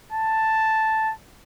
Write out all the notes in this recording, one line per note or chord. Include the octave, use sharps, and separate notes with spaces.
A5